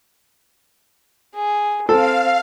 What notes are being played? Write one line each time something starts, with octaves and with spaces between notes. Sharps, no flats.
G#4
C4 A4 F5